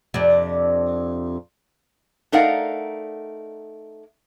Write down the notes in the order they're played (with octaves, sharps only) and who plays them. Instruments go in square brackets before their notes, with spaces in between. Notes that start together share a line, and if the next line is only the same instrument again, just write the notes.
[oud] F2 C3 D4
[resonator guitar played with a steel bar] A3 D#4 A#4 D5 F5 F#5